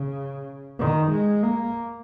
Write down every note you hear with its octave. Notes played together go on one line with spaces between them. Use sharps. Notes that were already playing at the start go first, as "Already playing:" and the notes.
Already playing: C#3
D#3
G#3
A#3